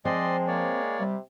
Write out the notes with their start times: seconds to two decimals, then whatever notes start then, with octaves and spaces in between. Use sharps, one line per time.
0.05 F3 G#3 C4 D5 D#5 C6
0.47 A#3 C#5 D5
1.00 C3 G3